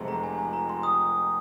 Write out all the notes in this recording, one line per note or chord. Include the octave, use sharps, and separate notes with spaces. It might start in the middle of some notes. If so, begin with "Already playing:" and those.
Already playing: F1 F2 C3 G#3
A#5
G#5
A#5
A#5
C6
D#6